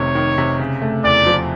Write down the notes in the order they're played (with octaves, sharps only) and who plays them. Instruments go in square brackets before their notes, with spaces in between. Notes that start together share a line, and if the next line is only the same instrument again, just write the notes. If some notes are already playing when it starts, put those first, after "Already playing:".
Already playing: [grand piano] F1 C3 D#3 [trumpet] C#5
[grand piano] D#3
C3
C#3
A3
[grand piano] E2 [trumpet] D5
[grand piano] F3